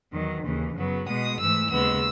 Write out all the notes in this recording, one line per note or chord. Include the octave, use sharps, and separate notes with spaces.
E2 D#3 F#3
D#2 C#3 E3
F#2 C#3 F#3 B3
B2 G#3 B3 D#6
G#2 E3 A3 E6
D#2 C#3 G#3 B3 E6